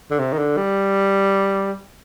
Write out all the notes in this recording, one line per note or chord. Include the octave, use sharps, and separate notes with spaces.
D3
C3
D#3
D3
G3